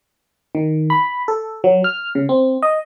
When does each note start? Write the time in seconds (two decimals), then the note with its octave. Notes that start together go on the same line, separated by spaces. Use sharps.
0.55 D#3
0.90 B5
1.28 A4
1.64 F#3
1.84 F6
2.15 C#3
2.29 C4
2.62 D#5